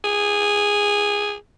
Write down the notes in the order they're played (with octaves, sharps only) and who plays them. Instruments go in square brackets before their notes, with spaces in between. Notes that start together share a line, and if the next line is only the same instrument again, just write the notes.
[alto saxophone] G#4